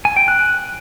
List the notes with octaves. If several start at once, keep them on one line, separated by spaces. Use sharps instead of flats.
G#5
G5
F#6